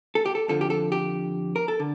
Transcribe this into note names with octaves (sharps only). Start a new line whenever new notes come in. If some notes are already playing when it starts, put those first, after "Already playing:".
A4
G4
A4
F2 D3 F3 A4
G4
A4
G4
A#4
A4
D3